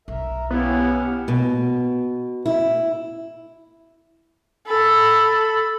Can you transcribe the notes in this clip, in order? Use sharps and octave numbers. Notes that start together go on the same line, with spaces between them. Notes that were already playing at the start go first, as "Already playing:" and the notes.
B1 A#4 E5
B3 C#4 E4 G4 F5
B2
E4
A4 B5